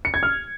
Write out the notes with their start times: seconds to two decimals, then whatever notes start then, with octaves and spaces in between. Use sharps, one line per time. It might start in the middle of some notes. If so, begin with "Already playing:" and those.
0.05 C#7
0.14 G#6
0.23 F6